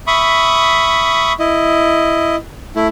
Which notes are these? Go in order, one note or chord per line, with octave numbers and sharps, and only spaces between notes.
E5 B5 C#6 D#6
E4 D#5
A3 E4